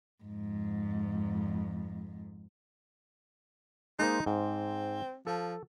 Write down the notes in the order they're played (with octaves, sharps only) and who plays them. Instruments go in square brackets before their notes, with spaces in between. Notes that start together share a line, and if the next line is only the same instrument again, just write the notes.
[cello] F2 G#2
[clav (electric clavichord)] G#3 A#3 C5 [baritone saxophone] D#4
[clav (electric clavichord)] G#2 [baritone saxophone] C4
[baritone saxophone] F3 [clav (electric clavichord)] A4